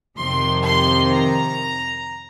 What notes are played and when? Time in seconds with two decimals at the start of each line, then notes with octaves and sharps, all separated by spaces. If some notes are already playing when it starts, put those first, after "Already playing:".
0.16 F2 C3 D#3 C6
0.65 C6
1.13 A#5